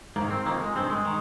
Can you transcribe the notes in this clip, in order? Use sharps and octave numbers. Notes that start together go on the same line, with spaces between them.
G#2 D#3 A#3
C4
F2 D#3 A#3
G#3
G2 D#3 C4
G#3
D#3